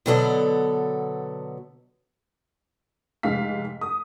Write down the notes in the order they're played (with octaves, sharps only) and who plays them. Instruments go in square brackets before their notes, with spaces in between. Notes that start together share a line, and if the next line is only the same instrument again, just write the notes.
[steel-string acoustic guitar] B2 D3 F#3 B3 A4 D5
[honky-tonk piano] F1 G#2 F5 B6
D#6